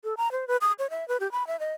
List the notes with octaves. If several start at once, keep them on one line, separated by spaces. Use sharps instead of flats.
A4
A#5
C5
B4
D#6
C#5
E5
B4
G4
B5
E5
D#5